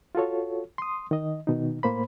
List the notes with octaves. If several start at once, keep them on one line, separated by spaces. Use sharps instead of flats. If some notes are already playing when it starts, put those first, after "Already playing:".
F4 F#4 A4 C#5
C6 D#6
D#3 D#5
B2 D#3 D#4
A2 A#3 C5 B5